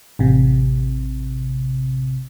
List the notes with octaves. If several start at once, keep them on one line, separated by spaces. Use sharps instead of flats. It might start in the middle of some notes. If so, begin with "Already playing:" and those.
A1 C3